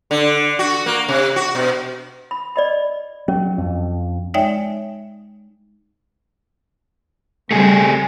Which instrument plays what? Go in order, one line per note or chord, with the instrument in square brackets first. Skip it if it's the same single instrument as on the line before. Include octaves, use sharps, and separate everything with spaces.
[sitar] D3
F#4
A#3
C3
F#4
B2
[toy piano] B5
D5 D#5 B5
[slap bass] F#3 [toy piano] C#4
[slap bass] F2
[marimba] G#3 D#4 C#5 D5 E5 G5
[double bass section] C#3 G3 C4 [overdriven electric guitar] A3 G#4